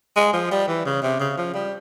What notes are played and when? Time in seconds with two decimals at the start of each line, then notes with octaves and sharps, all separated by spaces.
0.16 G#3
0.33 F3
0.51 G3
0.68 E3
0.86 C#3
1.02 C3
1.20 C#3
1.37 F3
1.54 G3